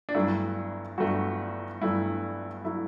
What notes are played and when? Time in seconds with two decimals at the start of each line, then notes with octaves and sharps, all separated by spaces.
0.09 D4
0.15 G1 G2 F#3 A3 E4
0.98 G1 G2 F#3 A3 F#4
1.81 G1 G2 F#3 A3 E4
2.64 F#3 A3 E4